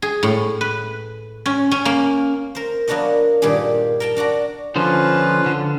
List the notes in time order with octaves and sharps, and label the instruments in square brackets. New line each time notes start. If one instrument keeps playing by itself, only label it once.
[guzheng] G#4
A2
B4
C#4
C#4
A#3
A#4 C5
F#3 A#3 B3 D4 F#4 D#5
G2 A#2 D#3 G3 G4 G#4
A#4 G5 A5
D4 F#4 D5 A#5
[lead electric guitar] D3 F3 [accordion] C#4 F4 B4
[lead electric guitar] D3